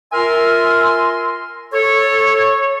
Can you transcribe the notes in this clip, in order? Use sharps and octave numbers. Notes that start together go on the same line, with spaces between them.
F4 A#4 E5 G#5 C6
A4 C#5